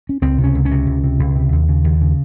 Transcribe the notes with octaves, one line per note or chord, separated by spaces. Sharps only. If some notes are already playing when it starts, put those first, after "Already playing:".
C#4
C#2 C4
C3
C#4
C#2
C#4
C3
C#2
C3
C#2
C3
D#2
C#3
D#2
C#3